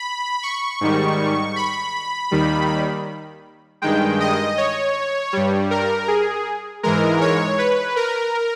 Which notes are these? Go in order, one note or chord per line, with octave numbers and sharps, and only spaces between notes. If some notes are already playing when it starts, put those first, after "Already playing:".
Already playing: B5
C#6
G#2 D#3 G3
B5
D#2 D#3 G3
G2 D#3 G#3 G5
D#5
C#5
G2 G3
A#4
G#4
G#2 E3 G#3 A#4
C#5
B4
A#4